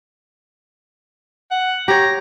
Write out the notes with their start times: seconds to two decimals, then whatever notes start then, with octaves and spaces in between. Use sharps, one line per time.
1.51 F#5
1.88 G4 C#5 A#5